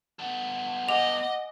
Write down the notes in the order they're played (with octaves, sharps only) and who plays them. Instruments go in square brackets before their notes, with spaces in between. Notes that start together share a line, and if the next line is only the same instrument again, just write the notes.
[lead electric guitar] B3 A4
[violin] D#5 [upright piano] F#5 G#5 D6 [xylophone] F7